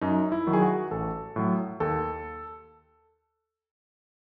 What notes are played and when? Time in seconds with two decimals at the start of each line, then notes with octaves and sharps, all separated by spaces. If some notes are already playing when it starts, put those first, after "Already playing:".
0.01 F#2 D#4
0.32 E4
0.47 D#3 F#3
0.53 G#4
0.62 F#4
0.91 A1 A4
1.36 A2 F#3
1.80 D#2 A4